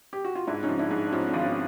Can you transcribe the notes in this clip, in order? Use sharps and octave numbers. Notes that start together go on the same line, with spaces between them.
G4
F#4
F4
G#2 D4 E4
C#4 D#4
F3
D4 E4
G#2
D4
F3 C#4 D#4
C4 D4
G#1
B3 C#4